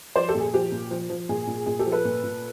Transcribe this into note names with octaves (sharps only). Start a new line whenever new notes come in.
F3 C5 D5
G4 A4
A#2
G#4
F3 G4
A#2
F3
F3
A#2 G#4
A#2
A#2 G#4
G4 A4
F3
A4 B4
A#2
A#2